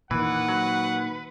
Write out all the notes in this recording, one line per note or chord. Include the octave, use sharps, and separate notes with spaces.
A#2 D#3 E3 B4 F#5
F#3